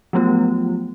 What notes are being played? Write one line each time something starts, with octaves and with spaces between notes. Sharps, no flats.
F3 F#3 A3 B3 F4